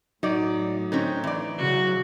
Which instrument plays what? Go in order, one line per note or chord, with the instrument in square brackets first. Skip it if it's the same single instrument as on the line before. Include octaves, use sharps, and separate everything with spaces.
[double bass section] A2 [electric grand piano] F#3 [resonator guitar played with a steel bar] D#4 D5
[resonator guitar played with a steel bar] D3 C4 C#4 [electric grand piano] D#4
[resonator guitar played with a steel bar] E3 D5
[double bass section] C#3 F#3 [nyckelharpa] F#4